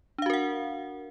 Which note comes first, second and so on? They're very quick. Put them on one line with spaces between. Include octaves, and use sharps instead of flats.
D4 F5 F#4 A#4 F#5